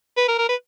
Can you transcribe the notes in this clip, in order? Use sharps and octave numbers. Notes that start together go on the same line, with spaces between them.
B4
A#4
A#4
B4